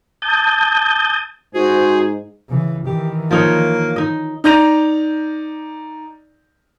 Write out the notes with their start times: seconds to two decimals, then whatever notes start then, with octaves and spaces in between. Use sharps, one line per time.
0.22 A5 D#6 G6
1.54 G#2 F#4 G#4 C5
2.49 C#3 E3
2.86 D#3 E3 G4
3.31 F3 A#3 D#4 C#5
3.96 D#4 D#5
4.44 D#4 D5 G6 A#6 F7